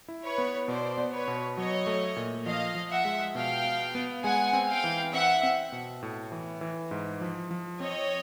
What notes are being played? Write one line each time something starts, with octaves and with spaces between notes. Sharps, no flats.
E4
B4 C#5
B3
B2 C5 D5
B3
B4 C#5
B2
F#3 C#5 D#5
A3
A#2
F3 D#5 F5
F3
E5 F#5
G#3
B2 F5 G5
B3
B3
G#3 F#5 G#5
C4
F5 G5
E3
C4 E5 F#5
C4
B2
A2
E3
E3
G#2
F3
F3
C4 C#5 D#5